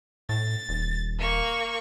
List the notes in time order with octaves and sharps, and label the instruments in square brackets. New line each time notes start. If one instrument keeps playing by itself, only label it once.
[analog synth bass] A2 [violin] A6
[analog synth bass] D#1
[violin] A#3 C#6